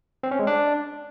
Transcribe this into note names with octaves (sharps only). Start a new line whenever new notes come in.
C4
C#4
G#3
D4